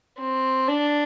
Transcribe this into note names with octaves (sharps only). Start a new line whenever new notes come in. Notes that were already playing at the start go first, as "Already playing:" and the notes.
C4
D4